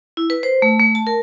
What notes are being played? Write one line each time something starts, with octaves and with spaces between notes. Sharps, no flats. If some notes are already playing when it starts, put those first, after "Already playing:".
E4
B4
C5
A3
A3
A5
A#4